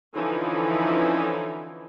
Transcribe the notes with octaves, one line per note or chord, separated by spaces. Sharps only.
D3 E3 F3 C#4 D#4 E4